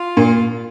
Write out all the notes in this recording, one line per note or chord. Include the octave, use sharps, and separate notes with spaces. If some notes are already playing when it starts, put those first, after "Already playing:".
Already playing: F4
A#2